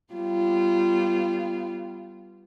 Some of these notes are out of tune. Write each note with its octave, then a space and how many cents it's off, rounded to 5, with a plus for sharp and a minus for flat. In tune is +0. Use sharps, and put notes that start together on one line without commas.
G3 -10 B3 +0 F4 -25